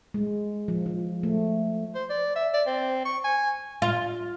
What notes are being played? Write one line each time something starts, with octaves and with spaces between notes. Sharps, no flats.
G#3
F3
F3
A3
C5
D5
E5
D5
C4
C#6
G#5
F4